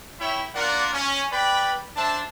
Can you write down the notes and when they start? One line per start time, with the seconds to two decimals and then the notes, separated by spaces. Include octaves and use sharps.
0.20 E4 C#5 E5 G5 B5
0.55 A#3 D4 F4 A#4 D5 F#5
0.93 C#4
1.32 B4 D5 G5 B5
1.96 D4 C5 E5 A5